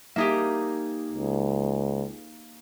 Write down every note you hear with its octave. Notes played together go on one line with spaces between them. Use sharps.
A#3 D#4 G4 G#4 E5
C#2